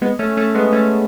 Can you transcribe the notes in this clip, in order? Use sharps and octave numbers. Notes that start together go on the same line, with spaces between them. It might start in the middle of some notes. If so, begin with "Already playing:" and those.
G#3 B3
A3 C#4
A3 C#4
G#3 B3
A3 C#4